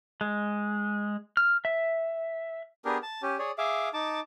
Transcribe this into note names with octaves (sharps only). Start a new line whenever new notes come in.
G#3
F6
E5
B3 D4 G4 G#4 A#4
A5
C#4 G4
G#4 C#5 D5
G#4 E5 F5 D6
D#4 A5 D6